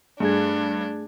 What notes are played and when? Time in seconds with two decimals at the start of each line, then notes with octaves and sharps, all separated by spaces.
0.20 G2 A3 D4 G#4 G#6